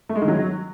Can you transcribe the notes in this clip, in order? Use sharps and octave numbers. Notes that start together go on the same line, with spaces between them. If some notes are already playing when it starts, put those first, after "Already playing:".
A3
G#3
D#3
F#3